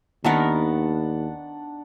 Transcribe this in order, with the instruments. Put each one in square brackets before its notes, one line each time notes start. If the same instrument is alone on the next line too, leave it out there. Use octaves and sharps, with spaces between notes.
[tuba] D#2 [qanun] D#3 B3 A#4 [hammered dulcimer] D4 F#5 A5